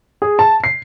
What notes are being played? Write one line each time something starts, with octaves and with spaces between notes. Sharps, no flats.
G#4
A5
C7